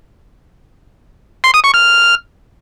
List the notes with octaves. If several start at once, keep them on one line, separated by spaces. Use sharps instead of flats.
C6
D#6
C#6
F6